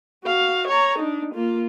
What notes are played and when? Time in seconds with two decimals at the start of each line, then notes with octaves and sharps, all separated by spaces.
0.24 F#4 F5
0.67 C#5 A#5
0.99 D4 D#4
1.33 A#3 F4